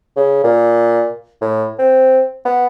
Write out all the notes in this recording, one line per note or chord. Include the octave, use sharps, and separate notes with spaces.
C#3
A#2
A2
C4
B3